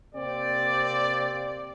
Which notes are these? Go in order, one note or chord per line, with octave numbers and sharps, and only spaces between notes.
C3 A#3 C4 G4 D5